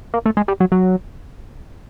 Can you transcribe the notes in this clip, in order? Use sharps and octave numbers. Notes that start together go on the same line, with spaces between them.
A#3
A3
G#3
G3
F#3
F#3